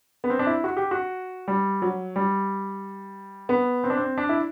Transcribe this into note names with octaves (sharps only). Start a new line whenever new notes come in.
B3
C4
D4
E4
F#4
G4
F#4
G3
F#3
G3
B3
C4
D4
C4
D4
E4